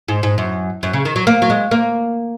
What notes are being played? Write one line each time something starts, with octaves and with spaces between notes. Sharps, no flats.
G#2
G#2
F#2
F#2
C#3
D#3
F#3
A#3
F#3
G#3
A#3